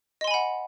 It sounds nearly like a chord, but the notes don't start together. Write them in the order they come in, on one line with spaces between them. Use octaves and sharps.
D#5 C6 G#5 B5 F#5